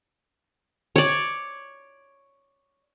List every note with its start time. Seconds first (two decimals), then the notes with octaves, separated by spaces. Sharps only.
0.96 C#5 D5